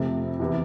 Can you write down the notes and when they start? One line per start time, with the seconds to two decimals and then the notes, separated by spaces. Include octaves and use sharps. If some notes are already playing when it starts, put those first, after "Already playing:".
Already playing: F2 C3 F3 A3 C4
0.39 E2 C3 E3